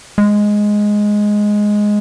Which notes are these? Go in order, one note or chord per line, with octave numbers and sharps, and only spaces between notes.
G#3